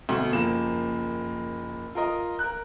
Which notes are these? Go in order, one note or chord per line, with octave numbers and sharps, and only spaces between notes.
D2 B2
F#1 F3 A#3 E7
F4 A#4 D#5
A#4 F#6